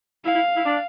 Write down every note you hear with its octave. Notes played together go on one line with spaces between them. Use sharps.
E4 F5
E4
E4
D4